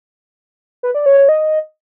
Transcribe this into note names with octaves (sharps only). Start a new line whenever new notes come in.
B4
D5
C#5
C#5
D#5